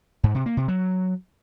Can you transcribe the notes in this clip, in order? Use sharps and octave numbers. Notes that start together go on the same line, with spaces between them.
G#2
C3
A#3
C3
F#3